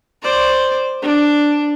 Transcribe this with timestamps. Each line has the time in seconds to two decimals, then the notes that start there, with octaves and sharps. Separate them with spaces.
0.23 C5 D5
1.02 D4